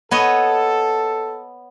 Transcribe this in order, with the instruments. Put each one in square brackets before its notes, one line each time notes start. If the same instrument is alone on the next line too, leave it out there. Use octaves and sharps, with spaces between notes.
[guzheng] B3 C#5 D#5 [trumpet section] A4